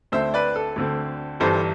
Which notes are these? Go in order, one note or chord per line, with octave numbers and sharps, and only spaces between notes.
D2 D3 A3 C4 C5 E5
B4 D5
A4
D2 D3 A3 C4
G1 G2 E3 G3 A4 C5